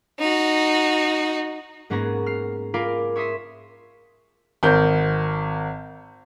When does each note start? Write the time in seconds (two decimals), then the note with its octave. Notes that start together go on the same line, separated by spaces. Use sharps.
0.19 D#4 F#4
1.90 G#2 A#3 B3 C#4 G#4 A#5
2.26 F6 C7
2.74 F4 A#4 F5 G#5 B5 D6
3.16 C#5 E5 C6 D#6 B6
4.63 G#1 A#4 G6